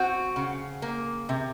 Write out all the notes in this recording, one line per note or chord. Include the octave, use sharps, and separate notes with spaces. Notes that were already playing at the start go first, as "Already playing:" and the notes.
Already playing: C4 F#4
C#3
A#3
C3